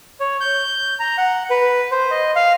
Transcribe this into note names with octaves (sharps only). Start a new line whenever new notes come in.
C#5
G6
A#5
F#5
B4
C5
D#5
F5